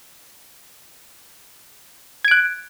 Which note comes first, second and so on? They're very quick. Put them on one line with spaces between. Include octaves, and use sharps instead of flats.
G#6 D7 F#6